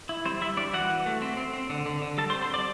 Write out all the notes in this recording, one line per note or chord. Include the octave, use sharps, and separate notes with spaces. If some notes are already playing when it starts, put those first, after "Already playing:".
E4
G3 C4 C5
G3 E4 E5
G3 D4 D5
E3 F#4 F#5
E3
A3
C4
C4
C4
D3
D3
D3
G3 A4 A5
C5 C6
C4
C5 C6
G3 D5 D6